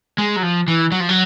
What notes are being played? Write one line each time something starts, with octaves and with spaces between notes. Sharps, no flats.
G#3
F#3
F3
E3
F#3
F3
F#3